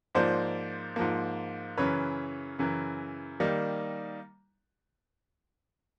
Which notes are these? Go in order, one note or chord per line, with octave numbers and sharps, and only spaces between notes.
G#2 F3 A#3 C5 D5
G#2 F3 A#3
F#2 C#3 E3 B4 C#5
F#2 C#3 E3
D#3 G3 A#3 D#4